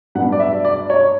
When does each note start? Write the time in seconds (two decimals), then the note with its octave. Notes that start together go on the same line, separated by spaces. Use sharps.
0.15 G2 F#3 B3 F#5
0.32 D5
0.39 E5
0.65 D5
0.90 C#5